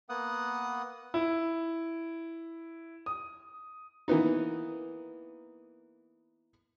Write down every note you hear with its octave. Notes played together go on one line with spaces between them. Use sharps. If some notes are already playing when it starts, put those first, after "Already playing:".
A#3 B3 F#5 D#6
E4
D#6
E3 A#3 B3 D#4